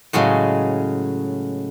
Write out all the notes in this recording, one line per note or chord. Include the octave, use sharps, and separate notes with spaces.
A2 C#3 F#3 G#3